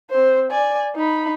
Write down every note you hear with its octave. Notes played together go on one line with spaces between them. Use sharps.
C4 C5
D5 G#5
D#4 B5